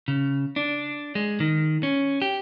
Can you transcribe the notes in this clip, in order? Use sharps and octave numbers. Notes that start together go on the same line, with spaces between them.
C#3
D4
G#3
D#3
C#4
G4